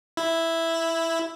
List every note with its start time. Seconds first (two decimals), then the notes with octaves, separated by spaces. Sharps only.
0.17 E4